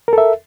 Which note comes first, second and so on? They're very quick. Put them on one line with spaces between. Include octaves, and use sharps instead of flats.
A#4 A4 E5